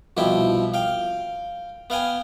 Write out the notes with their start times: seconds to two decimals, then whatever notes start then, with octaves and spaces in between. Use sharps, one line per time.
0.17 C2 B2 F3 E4 G5
0.74 F5 G5
1.90 B3 F5 G5 G#5